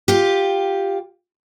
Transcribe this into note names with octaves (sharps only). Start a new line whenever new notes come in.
F4 G4